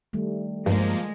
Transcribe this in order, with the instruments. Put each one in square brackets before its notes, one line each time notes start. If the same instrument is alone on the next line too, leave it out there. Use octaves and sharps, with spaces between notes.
[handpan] D#3 G3 A3
[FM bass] G2 [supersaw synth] F3 A#3 [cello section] G#3